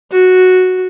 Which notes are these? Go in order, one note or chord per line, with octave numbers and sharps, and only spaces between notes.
F#4